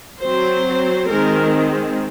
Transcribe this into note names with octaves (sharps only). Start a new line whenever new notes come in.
F#3 C4 C5
D#3 G#3 C4 A#4